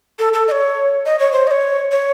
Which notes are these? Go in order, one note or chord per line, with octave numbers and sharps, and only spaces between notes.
A4
A4
D#5
C#5
D#5
C#5
C5
D#5
C#5
C#5